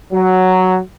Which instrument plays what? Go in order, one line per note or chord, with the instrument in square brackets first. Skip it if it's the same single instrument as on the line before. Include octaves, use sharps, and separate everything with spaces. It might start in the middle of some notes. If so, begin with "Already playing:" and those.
[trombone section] F#3